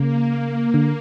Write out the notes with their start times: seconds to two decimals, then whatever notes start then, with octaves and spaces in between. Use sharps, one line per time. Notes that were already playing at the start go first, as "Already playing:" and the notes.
Already playing: C#3 A#3
0.74 D3